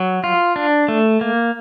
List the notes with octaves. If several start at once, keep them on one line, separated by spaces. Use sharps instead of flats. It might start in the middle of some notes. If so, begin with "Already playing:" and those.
Already playing: F#3
F4
D4
A3
A#3